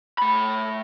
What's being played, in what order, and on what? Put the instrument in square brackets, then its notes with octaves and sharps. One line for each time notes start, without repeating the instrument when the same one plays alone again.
[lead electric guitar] A3 B5